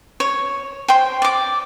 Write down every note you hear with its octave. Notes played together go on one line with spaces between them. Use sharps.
C#5
C5 G5
D5 D6